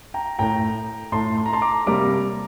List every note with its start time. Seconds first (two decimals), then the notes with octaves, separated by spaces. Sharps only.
0.14 G5 A#5
0.39 A2 A3 G5 A#5
1.12 A2 A3 A5 C6
1.37 C6
1.46 A#5
1.53 A5 C6
1.62 A#5 D6
1.86 C3 G3 A#3 A#5 D6